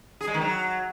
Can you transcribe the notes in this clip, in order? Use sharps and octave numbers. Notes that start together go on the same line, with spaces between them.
G#4
G#3
D#3
F#3